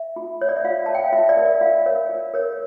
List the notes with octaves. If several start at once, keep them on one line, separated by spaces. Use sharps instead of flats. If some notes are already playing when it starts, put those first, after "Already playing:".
Already playing: E5
F4
C#5
D5
E5
F4 F5
C#5 A5
G5
F5
F4 E5
D5
A#4 C#5
D5
F4 F5
A#4 C#5
F4
A#4 C#5